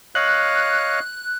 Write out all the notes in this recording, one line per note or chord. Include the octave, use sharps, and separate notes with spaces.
C#5 D#5 F5 F#6